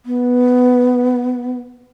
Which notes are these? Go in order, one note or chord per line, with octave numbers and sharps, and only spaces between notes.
B3